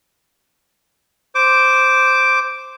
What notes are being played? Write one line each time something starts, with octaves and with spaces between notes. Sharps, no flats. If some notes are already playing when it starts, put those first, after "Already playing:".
C5 D6